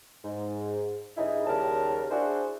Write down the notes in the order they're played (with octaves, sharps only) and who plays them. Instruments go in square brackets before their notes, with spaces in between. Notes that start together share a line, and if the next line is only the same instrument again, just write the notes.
[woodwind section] G#2
G2 C#3 D#4 E4 G#4
D#2 C#3 G3 A#4 A5
D4 E4 F#4 G#4 C5